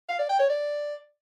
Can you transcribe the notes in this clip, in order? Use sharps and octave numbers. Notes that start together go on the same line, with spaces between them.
F5
D5
G5
C#5
D5